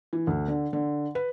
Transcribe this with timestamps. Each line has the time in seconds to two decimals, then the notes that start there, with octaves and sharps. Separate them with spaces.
0.13 E3
0.27 D2
0.48 D3
0.73 D3
1.15 B4